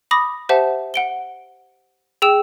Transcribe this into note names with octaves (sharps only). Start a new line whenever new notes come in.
B5 D6 D#6 A#6
G4 C5 E5 F#5 A5
F#5 D7 G7
G#4 G5 E6 E7